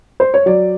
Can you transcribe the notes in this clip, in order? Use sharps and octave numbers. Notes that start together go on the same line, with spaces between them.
C5
C#5
F#3 D5